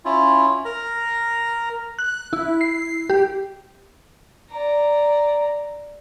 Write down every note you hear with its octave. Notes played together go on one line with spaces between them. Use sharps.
C#4 E4 F4
A#4 A#5
F#6
E4
C7
G4
D5 A#5